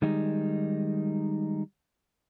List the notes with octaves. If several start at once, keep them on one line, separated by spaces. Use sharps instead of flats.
D#3 G3 G#3 D#4